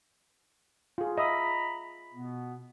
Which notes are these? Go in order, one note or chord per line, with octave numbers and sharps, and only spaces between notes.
F4 G#4
D#5 E5 A#5 B5 D#6
B2 B3